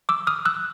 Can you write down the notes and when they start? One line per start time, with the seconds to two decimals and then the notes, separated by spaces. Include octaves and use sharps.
0.09 D6 E6
0.27 D#6 F6
0.45 E6 F#6